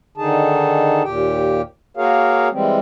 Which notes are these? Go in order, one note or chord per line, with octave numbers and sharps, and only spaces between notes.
D3 D#3 D#4 G#4 A5
D#2 A#2 G4 G5
A#3 F#4 G#4 A#4 C#5 F5
E3 G3 G#3 C4